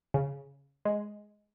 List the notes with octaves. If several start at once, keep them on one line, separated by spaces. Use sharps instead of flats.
C#3
G#3